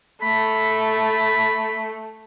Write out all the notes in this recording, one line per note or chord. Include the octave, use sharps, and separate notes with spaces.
A3 B5